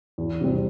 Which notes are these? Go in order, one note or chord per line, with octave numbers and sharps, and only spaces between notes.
E2
C3 G3 C4